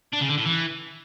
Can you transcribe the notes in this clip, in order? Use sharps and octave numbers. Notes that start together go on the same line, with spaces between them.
D4
C#3
D3
A2
E3